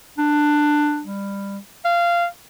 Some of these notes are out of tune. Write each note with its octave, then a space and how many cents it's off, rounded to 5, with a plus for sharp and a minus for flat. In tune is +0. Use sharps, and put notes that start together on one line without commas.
D4 +15
G3 +20
F5 -15